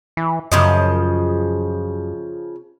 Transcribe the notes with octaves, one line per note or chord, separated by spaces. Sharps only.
E3
F#2 C#3 F3 D#5